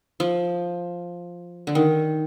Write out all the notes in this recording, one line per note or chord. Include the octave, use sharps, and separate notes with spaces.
F3
D3
D#3